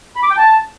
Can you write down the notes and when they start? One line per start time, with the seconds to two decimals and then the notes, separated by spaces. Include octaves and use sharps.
0.16 B5
0.23 D6
0.30 G5
0.37 A5